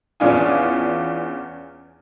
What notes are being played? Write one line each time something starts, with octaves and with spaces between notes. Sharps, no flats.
E2 E3 C#4 D4 F4 G#5